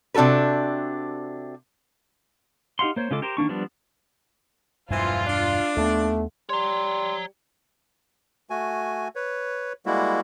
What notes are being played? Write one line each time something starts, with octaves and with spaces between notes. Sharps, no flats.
C3 D4 F#4 A4 B4
D#4 G4 F5 F#5 C6
A#3 C5 C#5
C#3 G#3 F4 A4 D6
G4 A#4 C5
D#3 A#3 D4 C#6
F3 G3 B3 D4
E1 G2 A#2 E3 F3 F4
D4
D#2 A3 B3
G3 C#5 A#5 C6
A3 F#4 G#5
B4 C#5
G3 G#3 A#3 E4 F#4